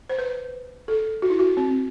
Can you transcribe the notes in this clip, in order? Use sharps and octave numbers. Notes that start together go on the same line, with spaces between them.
C5
B4
A4
F#4
E4
F#4
C4